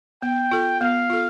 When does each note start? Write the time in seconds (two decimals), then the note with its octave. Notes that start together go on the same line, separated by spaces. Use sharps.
0.22 B3 G5
0.51 F4 A4
0.81 B3 F5
1.10 F4 A4